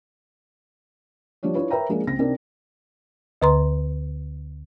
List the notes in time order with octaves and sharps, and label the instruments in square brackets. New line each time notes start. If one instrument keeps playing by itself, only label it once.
[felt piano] F3 G3 D4 G4 C#5
D4 E4 F4 B4 C#5
A#4 B4 C#5 E5 G5 A#5
F3 G#3 A#3 D4 G#4 A#4
C#2 C4 A#6
C3 C4 D4 D#4 A#4
[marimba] D2 D3 B4 A#5 C6